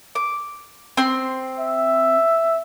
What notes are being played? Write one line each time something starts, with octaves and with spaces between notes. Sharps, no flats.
D6
C4 C6
E5